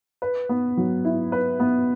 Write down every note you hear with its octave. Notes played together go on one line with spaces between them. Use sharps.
B4
B3
F#3
E4
B4
B3